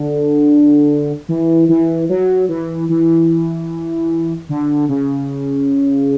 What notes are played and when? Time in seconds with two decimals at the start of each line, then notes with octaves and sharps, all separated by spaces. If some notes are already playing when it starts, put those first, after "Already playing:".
Already playing: D3
1.29 E3
1.69 E3
2.09 F#3
2.49 E3
2.89 E3
4.49 D3
4.89 C#3